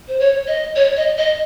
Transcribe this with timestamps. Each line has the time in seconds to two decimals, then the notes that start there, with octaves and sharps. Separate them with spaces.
0.08 C5
0.19 C#5
0.47 D#5
0.76 C#5
0.97 D#5
1.18 D#5